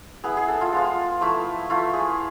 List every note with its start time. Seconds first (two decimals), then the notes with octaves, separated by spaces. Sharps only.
0.24 B3 E4 G#4
0.37 G#4
0.48 A4
0.61 F4
0.73 G#3 B3 F4
1.21 F3 A3 E4
1.70 A3 E4 F4
1.93 G#4